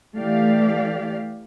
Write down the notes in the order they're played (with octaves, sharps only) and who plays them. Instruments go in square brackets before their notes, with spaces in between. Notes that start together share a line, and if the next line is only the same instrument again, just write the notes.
[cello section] E3 A3 G4 D5 F5